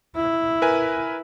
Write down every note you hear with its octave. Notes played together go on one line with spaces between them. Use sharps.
E4
A#4 B4 G#5